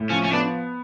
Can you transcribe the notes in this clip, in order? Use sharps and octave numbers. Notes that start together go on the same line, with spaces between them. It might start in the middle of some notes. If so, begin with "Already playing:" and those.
Already playing: A2
F3 C#4
C#4
B3 D4